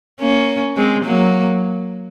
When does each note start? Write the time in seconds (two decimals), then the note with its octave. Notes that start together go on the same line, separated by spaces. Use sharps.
0.20 A#3 C#4
0.76 G#3 C4
1.04 F#3 A#3